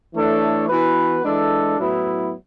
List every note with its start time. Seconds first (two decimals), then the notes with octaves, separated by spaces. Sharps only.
0.13 E3 A3 D4 A4 C#5
0.68 E3 B3 F#4 B4
1.23 E3 G#3 D4 A4
1.78 A2 F#3 B3 E4